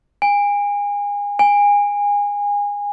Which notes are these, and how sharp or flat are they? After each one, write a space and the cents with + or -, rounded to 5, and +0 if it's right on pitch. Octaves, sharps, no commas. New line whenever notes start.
G#5 -30
G#5 -25